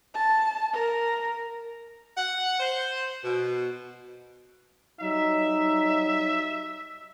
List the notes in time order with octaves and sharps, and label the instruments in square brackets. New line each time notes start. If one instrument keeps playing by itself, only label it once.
[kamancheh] A5
A#4
[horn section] F#5
C5
B2
[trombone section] F#3 G3 D#4 [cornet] E5